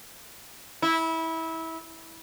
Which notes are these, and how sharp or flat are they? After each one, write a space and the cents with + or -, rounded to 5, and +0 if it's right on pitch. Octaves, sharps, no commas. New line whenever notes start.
E4 -20